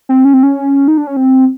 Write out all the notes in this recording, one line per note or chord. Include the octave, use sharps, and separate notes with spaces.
C4
C#4
C4
C#4
D#4
D4
C#4
C4